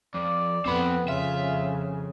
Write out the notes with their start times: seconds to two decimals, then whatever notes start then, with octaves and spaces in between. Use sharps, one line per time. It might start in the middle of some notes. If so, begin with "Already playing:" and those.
0.15 F2 D5
0.65 F2 B3 C4 B5
1.08 F2 C#3 F4 E5